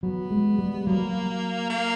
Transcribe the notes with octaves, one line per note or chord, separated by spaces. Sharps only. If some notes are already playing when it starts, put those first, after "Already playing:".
F#3 B3
G#3
G3
F#3 A#3
A#3